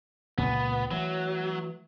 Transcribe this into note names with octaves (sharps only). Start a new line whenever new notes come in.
C#2 A#2 B3
E3 F#3 A3